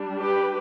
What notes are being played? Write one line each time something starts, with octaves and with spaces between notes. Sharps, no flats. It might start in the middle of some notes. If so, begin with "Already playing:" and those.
Already playing: G3 D4
G4 B4